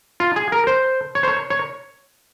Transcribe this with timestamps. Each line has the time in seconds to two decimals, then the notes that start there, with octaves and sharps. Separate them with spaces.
0.20 F4
0.36 G#4
0.52 A#4
0.67 C5
1.15 C#5
1.23 C5
1.28 C#5
1.50 C#5